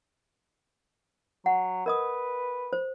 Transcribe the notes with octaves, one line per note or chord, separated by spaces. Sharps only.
F#3 F#5
A#4 B4 D#5 D#6
C5